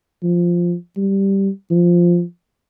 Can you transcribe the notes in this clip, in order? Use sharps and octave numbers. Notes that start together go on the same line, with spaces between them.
F3
G3
F3